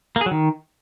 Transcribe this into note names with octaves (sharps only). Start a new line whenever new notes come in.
A#3
G#4
F#3
D#3